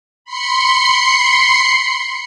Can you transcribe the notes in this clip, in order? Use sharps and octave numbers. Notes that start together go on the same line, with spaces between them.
B5 C6 C7 C#7